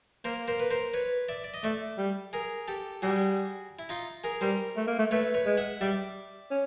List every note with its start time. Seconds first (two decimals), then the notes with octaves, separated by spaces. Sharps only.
0.25 A#3 A#4 C5
0.48 A#4 C5
0.60 B4
0.71 A#4 C5
0.94 B4 C#5
1.29 D5 E5
1.44 D5
1.54 D#5
1.64 A3 D5 E5
1.98 G3
2.33 G#4 A#4
2.68 G4 A4
3.02 G3 F#4 G#4
3.79 E4
3.89 D#4 F4
4.24 G#4 A#4
4.41 G3 A#4 C5
4.77 A3
4.87 A#3
4.99 A3
5.11 A3 B4 C#5
5.34 B4 C#5
5.46 G#3
5.57 E5 F#5
5.81 G3 D5 E5
6.51 C#4